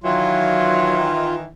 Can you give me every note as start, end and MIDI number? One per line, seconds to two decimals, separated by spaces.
0.04 1.45 51
0.04 1.45 52
0.04 1.08 54
0.04 1.35 65